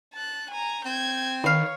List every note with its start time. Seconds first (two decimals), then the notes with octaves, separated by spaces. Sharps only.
0.14 A5 F#6
0.51 G#5 A#5
0.85 C4 G6 G#6
1.44 D#3 B4 C#5 F5